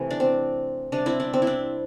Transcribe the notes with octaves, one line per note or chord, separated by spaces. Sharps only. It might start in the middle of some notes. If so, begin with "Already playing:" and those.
Already playing: C3 E3 A3
D4
C4
C3 G3 D4
C4 E4
D4
C4
E4
D4